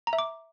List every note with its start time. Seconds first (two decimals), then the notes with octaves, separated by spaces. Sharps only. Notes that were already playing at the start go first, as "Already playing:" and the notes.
0.07 A#5
0.13 E5
0.19 D6